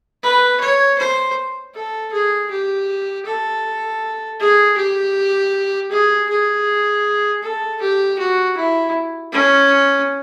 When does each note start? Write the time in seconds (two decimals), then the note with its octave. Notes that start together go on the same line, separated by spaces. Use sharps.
0.23 B4
0.60 C#5
0.98 C5
1.74 A4
2.12 G#4
2.51 G4
3.26 A4
4.40 G#4
4.77 G4
5.91 G#4
6.29 G#4
7.43 A4
7.81 G4
8.18 F#4
8.57 E4
9.32 C#4